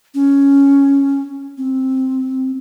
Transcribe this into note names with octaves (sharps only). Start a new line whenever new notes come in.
C#4
C4